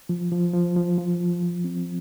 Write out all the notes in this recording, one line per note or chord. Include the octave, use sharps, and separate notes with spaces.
F3
F3
F3
F3
F3
F3
F3
C4